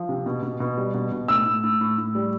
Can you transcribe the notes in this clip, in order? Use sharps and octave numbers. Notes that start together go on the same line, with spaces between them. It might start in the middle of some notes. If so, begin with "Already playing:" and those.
Already playing: F3
C3
B2
B2
B2
G3
B2
B2
A2 E6
A2
A2
A2
A2
G3